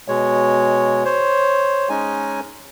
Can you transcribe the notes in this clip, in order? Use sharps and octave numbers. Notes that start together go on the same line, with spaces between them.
B2 G#3 C#5
C5 C#5
G#3 C#4 D#4 G#5